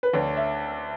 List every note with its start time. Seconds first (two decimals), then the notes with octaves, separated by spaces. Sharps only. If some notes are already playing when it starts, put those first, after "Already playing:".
0.03 B4
0.13 D2 D3 C#5
0.37 E5